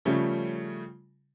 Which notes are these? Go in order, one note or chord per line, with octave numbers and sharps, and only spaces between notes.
C#3 F3 G3 A3 C#4